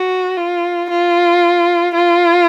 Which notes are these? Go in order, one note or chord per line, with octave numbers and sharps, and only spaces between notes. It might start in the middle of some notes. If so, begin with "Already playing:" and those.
Already playing: F#4
F4
F4
F4